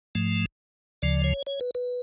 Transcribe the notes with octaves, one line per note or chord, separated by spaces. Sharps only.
G#2 F3 A3
D2 C#3 F3 D5
C#5
C#5
B4
B4